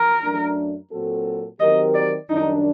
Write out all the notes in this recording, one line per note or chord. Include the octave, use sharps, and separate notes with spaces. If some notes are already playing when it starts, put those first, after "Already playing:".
Already playing: A#4
F#2 F#3 A3 D4
A#2 F#3 C4 F#4 A4
D#3 F#3 C4 G4 A#4 D#5
D5
F#2 D#3 G3 D4 D#4